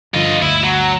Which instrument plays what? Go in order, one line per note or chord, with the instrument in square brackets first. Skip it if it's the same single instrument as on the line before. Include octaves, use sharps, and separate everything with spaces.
[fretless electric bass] G2 D3 F3 [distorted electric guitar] F4 D#5
[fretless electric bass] D2 G2 [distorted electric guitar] E4
[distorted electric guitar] F#3